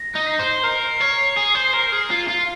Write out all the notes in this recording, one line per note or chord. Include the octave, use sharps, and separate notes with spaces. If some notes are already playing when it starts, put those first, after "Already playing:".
Already playing: A#6
D#4
C7
C5
A#4 C7
C#5
G#4
C5
A#4
G#4
F4 C7
F4